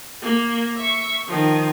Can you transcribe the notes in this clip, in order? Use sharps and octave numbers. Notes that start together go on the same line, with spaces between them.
A#3
E5 C#6
D#3 F3